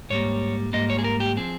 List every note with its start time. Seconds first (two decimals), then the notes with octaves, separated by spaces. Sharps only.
0.10 G#2 G3 A#3 C#5
0.73 G#2 G3 A#3 D#5
0.90 C#5
0.99 G#4
1.04 A#4
1.20 G4
1.37 F3 C4 G#4